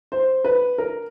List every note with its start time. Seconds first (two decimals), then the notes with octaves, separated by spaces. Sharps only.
0.12 C5
0.44 B4
0.78 A#4